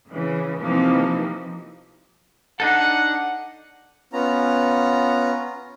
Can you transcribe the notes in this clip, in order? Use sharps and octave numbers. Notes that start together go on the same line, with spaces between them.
C#3 E3
C3 E3 F3 A#3 D#4
D4 D#4 A4 F#5
B3 C#4 F4 A#5